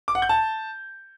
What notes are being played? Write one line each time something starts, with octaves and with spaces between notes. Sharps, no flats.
D6
F#5
G6
A5